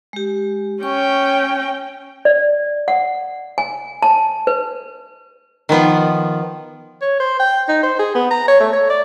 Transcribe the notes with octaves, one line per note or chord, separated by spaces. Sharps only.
G#3 G4
C#4 G5 C#6
D5
F#5
G#5
A5
B4
D#3 F3 B3 F4
C#5
C5
G5
D#4
C5
G#4
B3
A#5
C#5
A3
C#5
D5